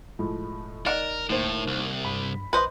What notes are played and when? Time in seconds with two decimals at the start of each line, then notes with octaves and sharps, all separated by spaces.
0.19 E1 A2 F3 G#3
0.86 D#4 A#4 D5 F#5 E7
1.30 D#2 A2 C5
1.68 C2
2.05 G2 B5
2.53 A#1 B4 C5 D#5